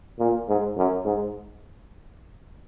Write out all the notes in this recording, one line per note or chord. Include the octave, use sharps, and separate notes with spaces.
A#2
G#2
F#2
G#2